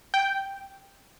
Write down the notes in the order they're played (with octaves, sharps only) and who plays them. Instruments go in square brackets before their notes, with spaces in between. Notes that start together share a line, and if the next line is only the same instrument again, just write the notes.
[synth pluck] G5